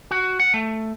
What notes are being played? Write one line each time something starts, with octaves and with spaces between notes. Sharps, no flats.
F#4
F#5
A3